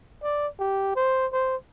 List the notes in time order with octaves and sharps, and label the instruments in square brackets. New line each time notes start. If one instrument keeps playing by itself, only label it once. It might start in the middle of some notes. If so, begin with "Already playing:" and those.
[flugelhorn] D5
G4
C5
C5